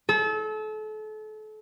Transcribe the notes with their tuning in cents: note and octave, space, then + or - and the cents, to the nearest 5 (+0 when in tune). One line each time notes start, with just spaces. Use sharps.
A4 -35